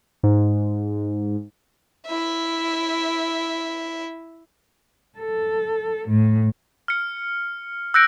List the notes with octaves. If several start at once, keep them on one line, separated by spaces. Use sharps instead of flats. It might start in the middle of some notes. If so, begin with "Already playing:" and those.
G#2
E4 E5
A4
A2
F6 C#7
E6 F#6 G6 A#6 C#7 D7